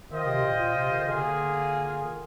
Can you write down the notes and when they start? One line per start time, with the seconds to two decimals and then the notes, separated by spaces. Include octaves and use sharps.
0.10 D#3 F4 C5 D#5 G5
0.26 C3
0.42 A#2
0.58 A#2
0.74 C3
0.90 D#3
0.99 D3
1.07 C3 A#3 F4 G#4
1.15 D3
2.03 D#3